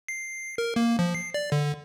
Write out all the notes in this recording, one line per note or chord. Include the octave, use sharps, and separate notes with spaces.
C7
A#4
A#3
F3
C7
D5
D3